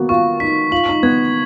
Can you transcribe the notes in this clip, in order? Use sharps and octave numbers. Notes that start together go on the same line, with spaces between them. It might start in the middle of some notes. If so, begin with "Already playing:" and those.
Already playing: A#3 B3 F#4
F4 C#6
D#4 B6
F4 F#7
D#4
B3 G#6